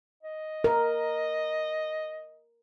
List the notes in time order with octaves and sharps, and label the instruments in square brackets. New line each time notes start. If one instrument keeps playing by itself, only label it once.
[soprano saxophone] D#5
[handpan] A#4